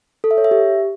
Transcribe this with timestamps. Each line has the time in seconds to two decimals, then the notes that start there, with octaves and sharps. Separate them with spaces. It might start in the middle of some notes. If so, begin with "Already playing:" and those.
0.24 A4
0.31 E5
0.38 C#5
0.44 E5
0.51 G4